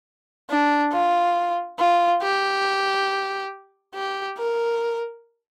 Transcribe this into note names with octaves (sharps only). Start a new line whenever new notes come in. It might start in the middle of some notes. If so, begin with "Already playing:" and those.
D4
F4
F4
G4
G4
A#4